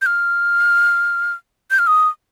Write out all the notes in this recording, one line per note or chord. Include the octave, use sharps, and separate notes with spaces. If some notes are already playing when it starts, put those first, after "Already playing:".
G6
F6
G6
F6
D#6